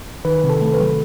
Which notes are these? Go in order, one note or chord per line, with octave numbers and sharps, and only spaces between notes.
D#3 B4
C3
A4
A3
B4
F#3